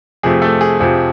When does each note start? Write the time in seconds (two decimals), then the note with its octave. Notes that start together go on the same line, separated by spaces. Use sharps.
0.23 F2 C3 F3 A3 G#4
0.42 A3 A4
0.61 G#4
0.80 F2 C3 F3 G#4